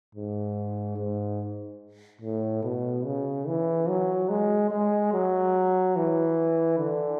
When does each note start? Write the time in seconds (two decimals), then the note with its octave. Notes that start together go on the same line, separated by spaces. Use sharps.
0.15 G#2
0.97 G#2
2.21 A2
2.63 B2
3.05 C#3
3.47 E3
3.88 F#3
4.29 G#3
4.71 G#3
5.13 F#3
5.96 E3
6.78 D3